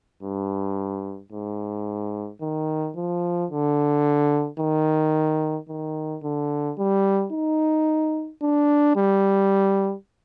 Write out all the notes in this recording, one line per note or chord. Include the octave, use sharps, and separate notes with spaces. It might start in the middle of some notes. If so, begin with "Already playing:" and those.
G2
G#2
D#3
F3
D3
D#3
D#3
D3
G3
D#4
D4
G3